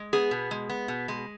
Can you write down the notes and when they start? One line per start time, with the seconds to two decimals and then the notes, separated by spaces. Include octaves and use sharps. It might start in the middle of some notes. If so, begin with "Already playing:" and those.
Already playing: G#3
0.13 B3 G#4
0.31 B2
0.51 G#3
0.69 B3
0.88 B2
1.08 G#3